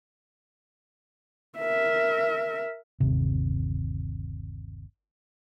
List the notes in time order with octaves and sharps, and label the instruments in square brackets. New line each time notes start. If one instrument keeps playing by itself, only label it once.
[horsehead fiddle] A#4 E5
[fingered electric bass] G1 D#2 C3